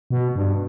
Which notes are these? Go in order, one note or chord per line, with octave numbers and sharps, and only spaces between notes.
B2
G2